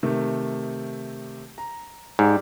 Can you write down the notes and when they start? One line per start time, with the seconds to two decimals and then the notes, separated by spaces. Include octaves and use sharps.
0.03 C3 D#3 A3
1.58 A#5
2.19 G#2 G4 D5